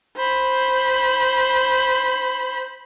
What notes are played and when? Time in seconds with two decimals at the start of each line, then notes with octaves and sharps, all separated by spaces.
0.17 C5 B5